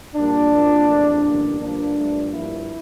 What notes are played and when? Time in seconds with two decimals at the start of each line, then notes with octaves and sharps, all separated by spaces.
0.15 A#1 A#2 G3 A#3 D4
0.51 C2 A#2 F3 A#3
0.88 E2 C3 F3 A3
1.24 A1 G2 D3 G3 A#3
1.60 G2 F3 A#3 D4
1.97 G2 F3 A3
2.32 G2 F3 A#3 E4